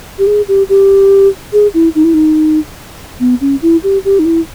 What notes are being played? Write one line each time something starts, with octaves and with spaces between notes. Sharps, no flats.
G4
G#4
G4
G4
G#4
E4
D#4
E4
D#4
B3
C#4
E4
G4
G4
D#4
E4